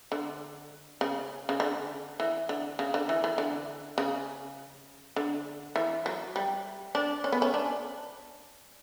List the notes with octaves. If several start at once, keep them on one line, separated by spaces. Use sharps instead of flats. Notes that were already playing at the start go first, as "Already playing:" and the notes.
D3
C#3
C#3
D3
E3
D3
C#3
D3
E3
E3
D3
C#3
D3
E3
F#3
G3
D4
C#4
B3
C#4
D4